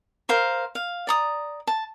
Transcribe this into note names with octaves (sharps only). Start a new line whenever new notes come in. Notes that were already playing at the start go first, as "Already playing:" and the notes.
A#4 C5 F5
F5
D5 A#5 D#6
A5